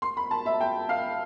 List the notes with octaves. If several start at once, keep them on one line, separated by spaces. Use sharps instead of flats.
C6
B5
A5
E5
G5
F5